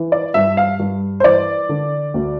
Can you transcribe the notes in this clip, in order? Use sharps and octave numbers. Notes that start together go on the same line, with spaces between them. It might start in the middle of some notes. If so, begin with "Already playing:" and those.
Already playing: E3
D5
G2 E5
F5
G2
C5
E3 D5
D3
D2